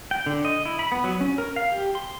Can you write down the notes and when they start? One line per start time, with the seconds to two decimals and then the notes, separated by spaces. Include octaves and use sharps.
0.11 G5
0.26 D3
0.45 D#5
0.65 E4
0.79 B5
0.92 B3
1.04 F#3
1.21 C#4
1.38 A#4
1.56 F5
1.72 G4
1.95 C6